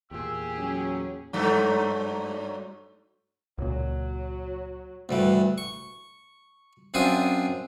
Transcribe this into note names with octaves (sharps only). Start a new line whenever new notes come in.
E2 A#2 G4 G#4 E6
F#3 C#4
G2 F#3 A3
C#2 A#2 F#3
D2 G2 E3
C#6
F#2 C4 D4 F4 G#5 D#6